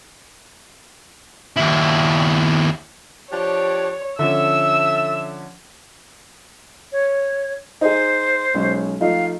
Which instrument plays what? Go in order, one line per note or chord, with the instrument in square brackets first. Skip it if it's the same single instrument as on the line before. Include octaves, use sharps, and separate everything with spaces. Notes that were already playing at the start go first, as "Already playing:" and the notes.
[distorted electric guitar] D#2 E4
[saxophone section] F3 D4 G4 [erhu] C#5
[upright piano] D3 F3 C#4 [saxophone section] A4 E5 [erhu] E6
[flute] C#5
[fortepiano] D#4 G#4 [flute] C5
[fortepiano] B1 G#3 C#4
[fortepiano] F3 A3 D#4 [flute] F5